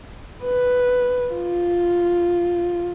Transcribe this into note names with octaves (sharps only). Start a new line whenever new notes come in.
B4
F4